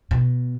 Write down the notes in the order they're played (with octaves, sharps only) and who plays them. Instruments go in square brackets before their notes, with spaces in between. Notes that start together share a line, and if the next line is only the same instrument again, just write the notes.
[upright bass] B2